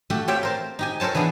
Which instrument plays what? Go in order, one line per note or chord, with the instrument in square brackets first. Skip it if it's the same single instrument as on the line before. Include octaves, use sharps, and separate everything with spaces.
[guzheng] A3 F#4 G4 A4
C4 G4 C#5 E5 F5 G5
A#4 C5 A5
D#4 G4 G#5
A4 A#4 C5 C#5 A5
E3 B3 D4 G#4